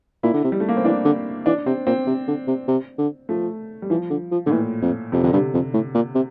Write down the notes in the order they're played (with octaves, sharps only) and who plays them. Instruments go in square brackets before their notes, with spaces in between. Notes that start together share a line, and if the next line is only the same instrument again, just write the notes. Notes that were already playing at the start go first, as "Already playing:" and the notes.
[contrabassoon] A#2 [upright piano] E4
[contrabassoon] D3
C3
[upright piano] G3
A3
A#3
C4
[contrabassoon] E3 [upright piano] D4
[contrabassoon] D3
[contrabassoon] E3 [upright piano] D4
[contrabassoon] C3 [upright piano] C4
[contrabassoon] A#2 [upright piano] C4
[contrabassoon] C3
D3
C3
C3
D3
[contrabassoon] F3 [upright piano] A3
[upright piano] G3
[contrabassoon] E3 [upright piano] F3
[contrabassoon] D3
F3
[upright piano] A2 [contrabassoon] D3
[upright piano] A#2 [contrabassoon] E3
[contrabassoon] F2
[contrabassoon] F2 [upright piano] C3
[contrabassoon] F2 [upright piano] D3
[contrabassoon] G2 [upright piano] C3
[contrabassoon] F2
A2
A#2
C3